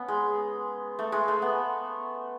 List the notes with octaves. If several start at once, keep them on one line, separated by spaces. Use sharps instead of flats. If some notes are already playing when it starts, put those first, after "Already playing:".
Already playing: B3 C#4
G#3
A3
G#3
A3
B3